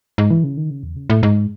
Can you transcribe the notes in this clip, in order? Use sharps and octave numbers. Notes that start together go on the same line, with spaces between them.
G#2
E3
C#3
D#3
C#3
E2
C#3
A2
G#2